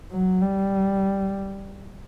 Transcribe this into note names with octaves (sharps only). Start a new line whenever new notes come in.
F#3
G3